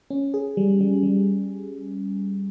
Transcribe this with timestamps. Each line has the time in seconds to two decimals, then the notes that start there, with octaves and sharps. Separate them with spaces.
0.10 C#4
0.34 G#4
0.57 G3
0.81 G3
1.03 G3